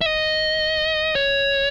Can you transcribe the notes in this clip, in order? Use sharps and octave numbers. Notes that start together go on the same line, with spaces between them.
E5
D#5
C#5